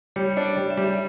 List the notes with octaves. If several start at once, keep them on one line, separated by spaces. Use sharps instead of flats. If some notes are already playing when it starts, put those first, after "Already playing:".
G3 C#5
D4
D5
G3
E5
G3